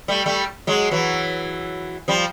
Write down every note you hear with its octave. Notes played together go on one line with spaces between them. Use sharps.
G3 A3
G3 A3
F#3 G#3
E3 F#3
F3 G3